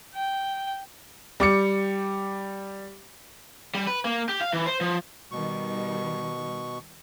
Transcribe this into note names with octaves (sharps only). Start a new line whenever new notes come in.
G5
G3 D6 C#7
G3
B4
A#3
G4
F5
E3
C5
F3
B2 D#3 G3 C#6